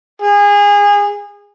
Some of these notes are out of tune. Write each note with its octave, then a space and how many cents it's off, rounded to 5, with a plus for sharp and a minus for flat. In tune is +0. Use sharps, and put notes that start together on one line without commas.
G#4 -25